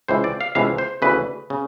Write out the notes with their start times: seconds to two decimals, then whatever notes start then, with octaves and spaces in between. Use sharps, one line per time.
0.08 C#2 C3 E3 C5
0.24 D5
0.41 F5
0.55 C#2 C3 E3 F5
0.78 C5
1.02 D2 C#3 E3 B4
1.50 C#3